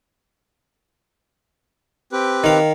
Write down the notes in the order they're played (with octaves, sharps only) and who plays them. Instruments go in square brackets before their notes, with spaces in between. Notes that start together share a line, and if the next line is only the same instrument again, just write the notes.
[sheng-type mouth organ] C4 G4 B4
[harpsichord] D#3 F5